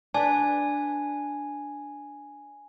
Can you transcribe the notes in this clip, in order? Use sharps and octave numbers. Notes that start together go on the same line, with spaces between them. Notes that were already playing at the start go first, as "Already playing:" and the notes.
D4 B4 G#5